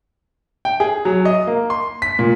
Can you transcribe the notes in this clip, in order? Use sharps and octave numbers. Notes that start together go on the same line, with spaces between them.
G5
G#4
F#3
D#5
A#3
C6
B6
A#2